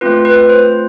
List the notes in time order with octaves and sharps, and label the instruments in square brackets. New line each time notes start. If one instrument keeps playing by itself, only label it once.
[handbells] A3 C4 F4 B4
B4
C5